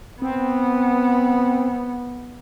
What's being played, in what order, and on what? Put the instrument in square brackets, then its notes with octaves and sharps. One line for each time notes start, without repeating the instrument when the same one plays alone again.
[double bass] B3 [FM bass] C4